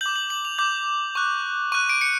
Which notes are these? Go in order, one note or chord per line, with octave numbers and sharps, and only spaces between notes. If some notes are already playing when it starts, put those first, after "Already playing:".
D6 G6 F#7
F#7
F#7
F7
D6 G6
C#6 F#6
C#6 F#6 D#7
D7
C#7